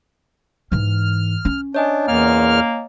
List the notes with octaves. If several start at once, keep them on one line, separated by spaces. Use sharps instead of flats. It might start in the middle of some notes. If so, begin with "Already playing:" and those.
G#2 E3 F6
C#4
D4 C#5 D#5 G#5
E2 A#2 A#3 F6